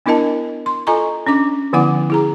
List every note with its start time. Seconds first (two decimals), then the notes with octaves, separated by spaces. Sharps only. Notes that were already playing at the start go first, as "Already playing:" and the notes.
0.06 B3 D4 E4 A#4 D#5 A5
0.66 C6
0.87 F4 A4 D#5 G#5 A#5 C#6
1.27 C#4 D4 D6
1.73 D3 F3 B3 E4 F#5 D6
2.10 E4 G#4 A#5